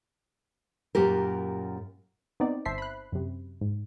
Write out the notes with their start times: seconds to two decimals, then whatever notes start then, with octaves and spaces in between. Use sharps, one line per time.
0.95 F#2 A#2 G4 A#4
2.40 B3 C4 D#4 D5
2.65 G1 C5 E5 A5 B6 C7
2.78 B5 F#6
3.12 F#2 C3
3.61 G#2